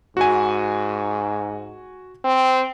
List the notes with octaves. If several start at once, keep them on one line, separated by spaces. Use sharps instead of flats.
G#2 F#4 G#5
C4